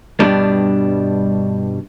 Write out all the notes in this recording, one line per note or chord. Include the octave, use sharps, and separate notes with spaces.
G2 B2 G3 D4